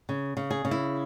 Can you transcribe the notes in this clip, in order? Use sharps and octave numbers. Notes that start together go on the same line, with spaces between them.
C#3
C#3
G#4
C#3
E4